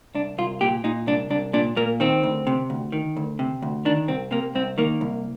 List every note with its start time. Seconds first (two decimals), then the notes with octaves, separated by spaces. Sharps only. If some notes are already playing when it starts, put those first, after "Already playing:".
0.15 C2 D4
0.38 C2 F4
0.61 A#2 G4
0.84 A#2 D#4
1.07 C2 D4
1.30 C2 D4
1.53 A#2 D4
1.76 A#2 A#3
2.00 D#3 C4
2.23 D2
2.47 C3
2.70 D2
2.92 D#3
3.17 D2
3.39 C3
3.62 D2
3.85 D#3 D4
4.08 C2 C4
4.31 C3 A#3
4.55 C2 C4
4.78 D#3 A#3
5.01 C2